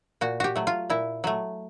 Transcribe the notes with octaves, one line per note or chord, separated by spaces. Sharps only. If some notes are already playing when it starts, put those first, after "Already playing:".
A#2 F#4
F#4 G4
F#3 A3
F4
A#2 E4
F#3 A3